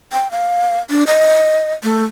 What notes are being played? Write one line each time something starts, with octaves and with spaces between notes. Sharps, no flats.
G5
F5
D4
D#5
A3